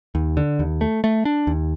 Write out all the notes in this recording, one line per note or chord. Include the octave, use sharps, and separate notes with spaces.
D#2
D3
D#2
A3
A3
D4
D#2